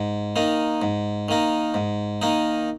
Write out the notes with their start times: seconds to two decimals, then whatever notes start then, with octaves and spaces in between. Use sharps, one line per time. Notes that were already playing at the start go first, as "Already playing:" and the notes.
Already playing: G#2
0.36 D#3 A#3 D#4
0.82 G#2
1.29 D#3 A#3 D#4
1.74 G#2
2.22 D#3 A#3 D#4